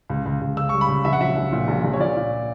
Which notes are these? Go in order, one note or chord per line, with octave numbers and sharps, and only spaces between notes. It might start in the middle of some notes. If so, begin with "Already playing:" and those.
C#2
C#2
C#2
C#3 E6
G3 C#6
B5
C#2
A#1 E5
F#5
F#3 E5
A#1
A#2
A#1
A#1
C#5
A#2 D5
A#2